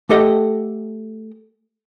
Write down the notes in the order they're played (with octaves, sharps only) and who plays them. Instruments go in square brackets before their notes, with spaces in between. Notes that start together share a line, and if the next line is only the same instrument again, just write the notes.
[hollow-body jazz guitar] A3 G4 A4 D#5 F#5 G5